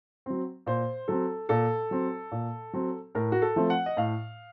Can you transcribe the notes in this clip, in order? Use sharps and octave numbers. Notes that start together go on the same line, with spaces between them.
F#3 C4
A#2 C5
F#3 C4 A4
A#2 A4
F#3 C4
A#2
F#3 C4
A2 A#4
F#4
A4
F3 A3 C4
F#5
D#5
A2 F5